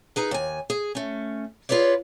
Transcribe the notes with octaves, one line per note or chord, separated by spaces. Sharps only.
D#4 G#4 B4
D#2 G#5
G#4
A3 C#4
F4 G#4 B4 C#5 D5